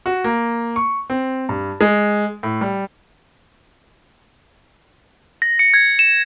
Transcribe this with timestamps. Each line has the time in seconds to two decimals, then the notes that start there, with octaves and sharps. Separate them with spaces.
0.06 F#4
0.24 A#3
0.76 C#6
1.10 C4
1.49 G2
1.81 G#3
2.43 A2
2.61 G3
5.42 A#6
5.59 C#7
5.74 G#6
5.99 E7